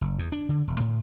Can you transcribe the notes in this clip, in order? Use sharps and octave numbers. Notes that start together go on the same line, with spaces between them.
F#1
E2
D4
D3
E1
A2